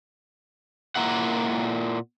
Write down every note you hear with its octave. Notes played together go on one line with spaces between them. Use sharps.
A#2 A#3 E4 F#5